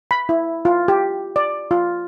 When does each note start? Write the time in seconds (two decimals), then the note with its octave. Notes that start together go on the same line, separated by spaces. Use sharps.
0.11 B5
0.29 E4
0.65 F4
0.88 G4
1.36 D5
1.71 F4